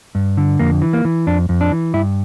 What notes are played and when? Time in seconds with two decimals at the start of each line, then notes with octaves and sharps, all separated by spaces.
0.15 G2
0.37 D3
0.60 F2 A#3
0.82 E3
0.93 A#3
1.05 E3
1.27 F2 D4
1.49 F2
1.61 D4
1.72 E3
1.94 G2 E4